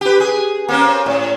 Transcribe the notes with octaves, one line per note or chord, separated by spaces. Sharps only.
G4 B4
G#4
A#3 C4 C#4
A2